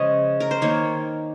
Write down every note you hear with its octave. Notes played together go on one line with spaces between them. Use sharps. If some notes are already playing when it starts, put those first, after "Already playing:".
Already playing: C#3 F3 G#3 C#5 D#5
A#4
C5
D#3 A#3 C#5